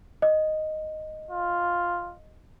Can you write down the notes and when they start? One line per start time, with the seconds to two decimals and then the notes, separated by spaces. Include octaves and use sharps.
0.22 D#5
1.31 F4